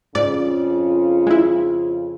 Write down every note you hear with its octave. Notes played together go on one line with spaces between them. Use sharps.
F2 G#2 C#3 F4 D5
G#3 E4